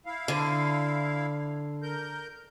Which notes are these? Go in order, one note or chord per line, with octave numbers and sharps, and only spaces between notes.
E4 F5
D3
A#4 G6